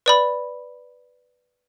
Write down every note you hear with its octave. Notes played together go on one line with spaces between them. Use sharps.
B4 D5 B5